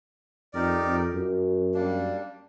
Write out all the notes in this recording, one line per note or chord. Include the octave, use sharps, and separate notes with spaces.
F2 D#4 G4 A#4 D5
F2
F#2
G3 A#3 D4